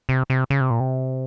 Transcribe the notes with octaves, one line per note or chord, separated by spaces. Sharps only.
C3
C3
C#3
C3
A#2
C3